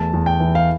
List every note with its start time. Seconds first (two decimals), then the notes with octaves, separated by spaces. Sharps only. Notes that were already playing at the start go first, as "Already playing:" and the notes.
Already playing: E2 A3 A5
0.14 E2
0.26 G5
0.40 E3
0.55 F5